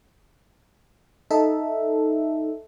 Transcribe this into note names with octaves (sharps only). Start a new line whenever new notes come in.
D#4 A4 E5